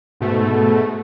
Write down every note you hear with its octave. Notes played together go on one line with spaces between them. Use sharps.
G#2 B2 A3